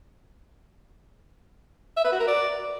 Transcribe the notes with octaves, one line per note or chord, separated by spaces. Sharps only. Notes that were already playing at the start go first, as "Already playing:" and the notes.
E5
B4
F#4
A#4
D5